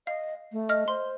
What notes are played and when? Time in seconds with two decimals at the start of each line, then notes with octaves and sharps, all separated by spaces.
0.07 D#5 F5
0.52 A3
0.69 D#5 F6
0.88 C5 C6